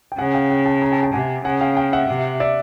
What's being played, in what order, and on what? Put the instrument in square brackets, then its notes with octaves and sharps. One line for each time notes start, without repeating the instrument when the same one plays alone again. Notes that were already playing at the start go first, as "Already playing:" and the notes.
[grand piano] G5
[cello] C#3 [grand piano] F#5 G#5
[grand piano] F5 G5
F5 G5
G5 A5
G#5 A#5
G5 A5
G5 A5
[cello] C3 [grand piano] F#5 G#5
[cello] C#3 [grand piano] F#5 G#5
[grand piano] F5 G5
F5 G5
E5 F#5
[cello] C3
[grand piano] D5 E5